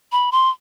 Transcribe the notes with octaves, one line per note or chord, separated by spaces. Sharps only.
B5
C6